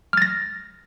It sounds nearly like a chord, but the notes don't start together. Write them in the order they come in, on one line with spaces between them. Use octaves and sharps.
F6 A6 A#6